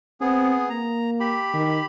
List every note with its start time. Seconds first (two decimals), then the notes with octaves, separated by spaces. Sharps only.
0.21 B3 C4 G#4
0.70 A#3 A#5
1.20 G4 B5
1.54 D#3